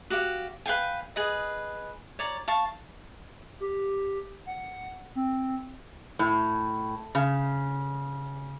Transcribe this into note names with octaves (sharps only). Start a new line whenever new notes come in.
F#4 G4 F5
B4 F5 G5 G#5
G#4 B4 D#5
C#5 D5 A#5
F5 A5 C#6
G4
F#5
C4
A2
C#3